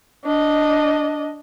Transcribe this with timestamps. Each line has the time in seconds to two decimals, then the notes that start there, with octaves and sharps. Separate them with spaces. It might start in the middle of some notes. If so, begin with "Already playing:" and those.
0.24 D4 D#5